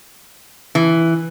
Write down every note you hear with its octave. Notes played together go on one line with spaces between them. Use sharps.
E3